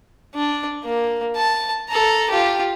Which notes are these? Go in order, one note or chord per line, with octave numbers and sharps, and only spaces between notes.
D4
A#3
A5
A4 A#5
F4 G4